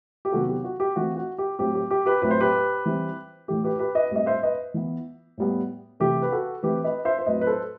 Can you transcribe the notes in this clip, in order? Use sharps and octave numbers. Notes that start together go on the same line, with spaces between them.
G4
C3 D#3 F#3 B3 F#4 A4
G4
F#4
G4
E3 A3 C4 F#4
F#4
G4
A2 F#3 C4 G4
G4
G4
G4 B4
A2 F#3 C4 B4
C5
G4 B4
E3 G3 C4
A2 E3 A3 G4
G4 B4
G4 B4
B4 D#5
A2 G3 C4 D#5
C5 E5
B4 D#5
E3 B3
A2 G3 B3
C3 E3 A3 G4
B4
F#4 A4
E3 A3 C4 G4 B4
B4 D#5
C5 E5
C5
A2 F#3 C4 B4 D#5
B4
A4 C5